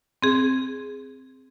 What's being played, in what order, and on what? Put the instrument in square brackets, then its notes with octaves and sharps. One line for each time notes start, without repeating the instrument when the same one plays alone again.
[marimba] C4 G#4